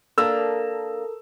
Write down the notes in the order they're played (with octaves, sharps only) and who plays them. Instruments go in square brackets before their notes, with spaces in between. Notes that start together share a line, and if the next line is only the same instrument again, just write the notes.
[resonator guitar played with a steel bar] A#3 D4 [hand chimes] A4 A#4 [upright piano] E6